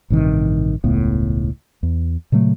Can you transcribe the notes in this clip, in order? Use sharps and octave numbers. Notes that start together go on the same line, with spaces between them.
A1 G2 C3 D#3
E1 C#2 A2 B3
E2
A#2 C#3 F#3 A3